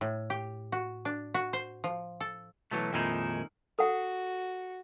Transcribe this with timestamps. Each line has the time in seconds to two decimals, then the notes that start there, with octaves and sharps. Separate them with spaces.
0.01 A2
0.30 G4
0.72 F#4
1.05 D4
1.34 F#4
1.53 C5
1.84 F3
2.20 A4
2.71 B2 E3 F#3 A3
2.93 F2 A#2 D#3 G#3 D#4 E4
3.79 F#4 A4 F#5